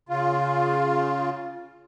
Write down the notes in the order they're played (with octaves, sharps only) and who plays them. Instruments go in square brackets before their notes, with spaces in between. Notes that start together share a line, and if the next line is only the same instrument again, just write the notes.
[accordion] C#3 F4